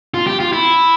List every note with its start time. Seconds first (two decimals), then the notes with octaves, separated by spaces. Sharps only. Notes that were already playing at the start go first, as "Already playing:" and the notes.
0.14 F4
0.27 G4
0.40 F4
0.52 E4